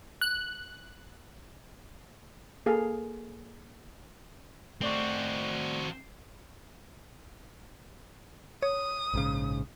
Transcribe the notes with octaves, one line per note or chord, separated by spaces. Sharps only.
F#6
A#3 G#4 A4 F5
A3 C4 F#4 D5 C#6
C#5 D#6
A#1 G#2 C#3